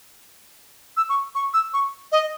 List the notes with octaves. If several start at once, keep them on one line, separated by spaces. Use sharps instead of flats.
E6
C#6
C#6
E6
C#6
D#5